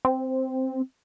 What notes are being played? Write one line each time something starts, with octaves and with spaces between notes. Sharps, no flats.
C4